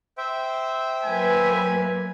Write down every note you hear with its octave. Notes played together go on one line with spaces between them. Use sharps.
C5 E5 G5
F#3 A#3 B4 G#5